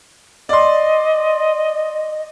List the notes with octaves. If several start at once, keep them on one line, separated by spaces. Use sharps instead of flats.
D5 D#5 C6